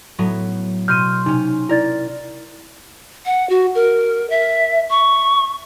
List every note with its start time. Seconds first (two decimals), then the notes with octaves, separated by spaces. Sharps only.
0.19 A2 F#3 B3
0.88 B2 C6 F6 G6 D#7
1.26 C3 C#4 D#4
1.69 E4 A#4 D5 A6
3.26 F#5
3.49 F#4
3.75 A#4
4.30 E5
4.90 C#6